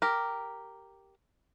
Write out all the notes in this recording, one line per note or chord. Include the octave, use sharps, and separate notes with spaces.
G4 A#4